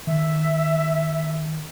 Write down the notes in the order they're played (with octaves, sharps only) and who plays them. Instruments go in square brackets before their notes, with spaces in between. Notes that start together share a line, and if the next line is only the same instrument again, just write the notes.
[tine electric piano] D#3 [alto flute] E5